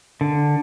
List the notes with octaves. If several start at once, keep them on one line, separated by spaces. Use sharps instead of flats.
D3